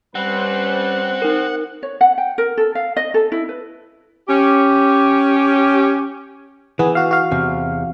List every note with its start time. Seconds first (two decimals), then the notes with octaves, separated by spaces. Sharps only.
0.15 G3 C4 C#4 B4 F#5
1.22 D#4 A#4
1.83 C#5
2.01 F#5
2.18 G5
2.38 A#4
2.57 A4
2.75 F5
2.97 D#5
3.14 A4
3.32 E4
3.49 B4
4.29 C#4 G4
6.79 E3 B3 G#4
6.95 F#4 F5
7.11 F#4 F5
7.31 E2 C3